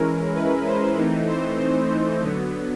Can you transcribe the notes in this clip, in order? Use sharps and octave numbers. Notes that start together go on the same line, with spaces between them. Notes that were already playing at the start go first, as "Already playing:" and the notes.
Already playing: E3 G#3 C#4 E4 A#4
B4
C5
E3 A3 C4 D#4
C5
C5
D3 F#3 B3